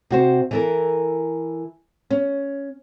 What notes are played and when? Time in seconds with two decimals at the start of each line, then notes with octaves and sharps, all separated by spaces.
0.10 C3 F#4 C5
0.51 E3 A4 A#4
2.10 C#4